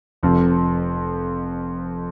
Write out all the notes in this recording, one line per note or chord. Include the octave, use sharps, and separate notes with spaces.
F1 F2 F3 C4